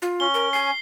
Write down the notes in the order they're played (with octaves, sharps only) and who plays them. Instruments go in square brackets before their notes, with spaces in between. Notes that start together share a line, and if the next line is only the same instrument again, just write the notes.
[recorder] F4
[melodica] C#4 [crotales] G7
[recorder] A#4
[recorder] G#5 [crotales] C7